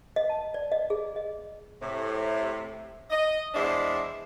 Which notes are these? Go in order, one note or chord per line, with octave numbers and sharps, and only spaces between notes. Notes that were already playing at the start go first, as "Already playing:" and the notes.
D#5
A5
D5
D#5
G#4
D#5
A2 C3
D#5
E2 G#3 D4 E4 C5 D5